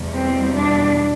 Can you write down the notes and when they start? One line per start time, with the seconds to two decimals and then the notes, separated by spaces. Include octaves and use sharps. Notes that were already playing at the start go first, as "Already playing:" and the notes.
Already playing: E2 B2 G3
0.14 C4
0.54 D4